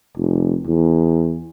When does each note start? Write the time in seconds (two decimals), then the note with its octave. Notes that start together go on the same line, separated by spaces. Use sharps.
0.17 F1
0.67 E2